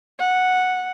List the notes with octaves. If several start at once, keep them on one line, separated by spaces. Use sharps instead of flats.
F#5